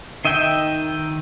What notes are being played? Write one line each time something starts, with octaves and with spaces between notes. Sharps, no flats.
D#3 D#5 E5 G5 G6